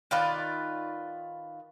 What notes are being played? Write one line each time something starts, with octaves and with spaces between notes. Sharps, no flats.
D#3 F4 B4 D5